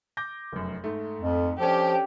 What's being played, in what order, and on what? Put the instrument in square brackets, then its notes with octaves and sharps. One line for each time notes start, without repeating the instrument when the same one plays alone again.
[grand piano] D6 G6 A#6
F1 F#2
G#2 A3
[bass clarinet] F2
[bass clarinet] F3 [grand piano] C#4 D4 A4 [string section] G4